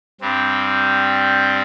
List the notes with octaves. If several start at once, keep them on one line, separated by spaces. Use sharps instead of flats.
G2 G3 C4